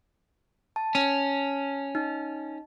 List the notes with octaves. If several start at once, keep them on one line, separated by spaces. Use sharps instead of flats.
A5
C#4
D#4